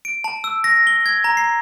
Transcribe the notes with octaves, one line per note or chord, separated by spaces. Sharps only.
D7
A5
E6
A#6
G7
G#6
A#5
C7